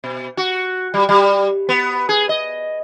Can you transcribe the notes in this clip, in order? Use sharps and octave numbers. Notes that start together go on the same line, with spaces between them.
B2
F#4
G3
G3
B3
G#4
D#5